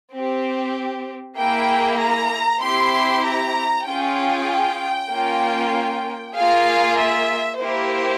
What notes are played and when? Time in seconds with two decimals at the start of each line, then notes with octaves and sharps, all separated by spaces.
0.13 C4 G4
1.37 A#3 E4 G#4 G5
1.99 A#5
2.62 C4 E4 G4 C6
3.24 A#5
3.86 C#4 F4 G#4 G5
5.11 A#3 C#4 F4
6.35 A#3 F4 G#4 F5
6.98 E5
7.59 A#3 E4 G4 C5